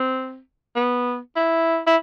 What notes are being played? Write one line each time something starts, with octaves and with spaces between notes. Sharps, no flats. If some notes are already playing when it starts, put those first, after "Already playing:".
Already playing: C4
B3
E4
E4